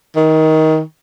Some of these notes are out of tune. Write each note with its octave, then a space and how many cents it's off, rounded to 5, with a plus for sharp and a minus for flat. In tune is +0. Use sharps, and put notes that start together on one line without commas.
D#3 +20